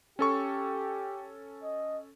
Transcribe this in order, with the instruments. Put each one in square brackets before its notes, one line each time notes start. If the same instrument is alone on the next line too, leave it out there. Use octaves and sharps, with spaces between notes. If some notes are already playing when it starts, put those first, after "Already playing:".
[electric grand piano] C#4 A4 C#6 [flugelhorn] G4
[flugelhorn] D#5